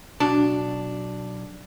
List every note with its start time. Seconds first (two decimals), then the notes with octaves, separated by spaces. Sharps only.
0.20 B1 D4 F#4 A5